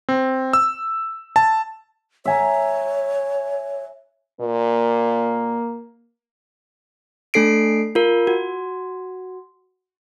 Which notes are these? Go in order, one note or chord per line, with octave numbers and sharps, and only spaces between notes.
C4
E6
A5
C#5 E5 G#5 A#5
A#2 A#3
A3 D4 A4 C7 D7
F4 A#4
F#4